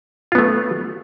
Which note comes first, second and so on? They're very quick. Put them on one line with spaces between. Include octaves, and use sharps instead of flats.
F4 B3 A3